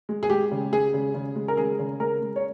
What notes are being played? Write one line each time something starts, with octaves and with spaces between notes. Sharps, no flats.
G#3
G#4
G#3 G4
C#3
G#3 G#4
C#3
C#3
G#3
A#4
C#3 G#4
C#3
G#3 A#4
G#3
C#5